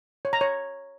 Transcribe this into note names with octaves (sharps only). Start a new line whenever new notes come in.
C#5
A#5
C#5